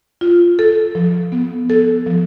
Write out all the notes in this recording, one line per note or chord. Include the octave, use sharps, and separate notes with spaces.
F4
A4
F3
B3
A4
F3